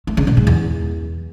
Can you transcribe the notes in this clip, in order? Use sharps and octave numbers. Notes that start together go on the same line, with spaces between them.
A3
C#3
B2
G#2
E2